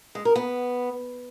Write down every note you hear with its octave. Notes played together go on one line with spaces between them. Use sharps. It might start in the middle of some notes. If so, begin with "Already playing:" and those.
G#3
A#4
B3